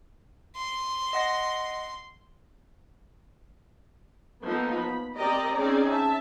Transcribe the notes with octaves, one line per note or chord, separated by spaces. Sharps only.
C6
D#5 F#5 A#6
F3 A#3 B3 D#4 A4
B5
C4 G4 A#4 D5 D#5 A#5
C4 C#4 D#4 G#4 D5
E5 A5